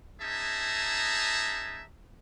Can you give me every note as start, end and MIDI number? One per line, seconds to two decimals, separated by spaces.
0.21 1.84 61
0.21 1.84 63
0.21 1.84 68
0.21 1.84 76
0.21 1.84 81
0.21 1.84 82